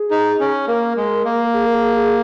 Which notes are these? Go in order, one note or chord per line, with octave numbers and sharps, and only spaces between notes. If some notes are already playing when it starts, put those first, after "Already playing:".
Already playing: G#4
D#4
C#4
A#3 A#4
G#3
A#3
G#4
A#4
G#4
G#4